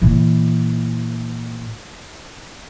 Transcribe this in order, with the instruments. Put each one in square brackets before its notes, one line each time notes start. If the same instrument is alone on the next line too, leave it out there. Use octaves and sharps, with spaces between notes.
[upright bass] A#2 E3